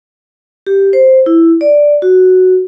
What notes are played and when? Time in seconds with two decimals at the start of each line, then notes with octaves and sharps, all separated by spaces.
0.67 G4
0.93 C5
1.26 E4
1.61 D5
2.02 F#4